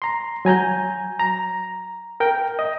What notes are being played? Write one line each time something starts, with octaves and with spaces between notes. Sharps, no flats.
A#5 C6
F#3 G#5 A#5 G6
A#5
A#4 G5
D#5